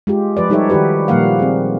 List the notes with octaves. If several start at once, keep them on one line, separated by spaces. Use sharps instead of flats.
G#3 F4 G4
F3 B4 D5
G3 D#4 G4 A4 C#5 E5
D#3 E4 F#4 G4 B4
A#2 F3 G3 A#3 F5 F#5
C4 G#4